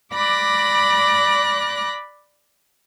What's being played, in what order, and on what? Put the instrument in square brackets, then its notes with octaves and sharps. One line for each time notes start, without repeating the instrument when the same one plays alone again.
[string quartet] D5 B5 D6 F#6 A#6